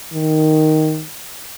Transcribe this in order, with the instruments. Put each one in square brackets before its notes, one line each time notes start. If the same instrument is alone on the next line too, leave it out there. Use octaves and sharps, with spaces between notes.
[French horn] D#3